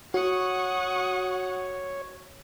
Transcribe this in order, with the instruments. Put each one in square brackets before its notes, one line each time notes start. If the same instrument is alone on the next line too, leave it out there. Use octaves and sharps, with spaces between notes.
[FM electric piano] F#4 [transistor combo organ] C#5 [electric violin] F#5 [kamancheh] C#6 D#6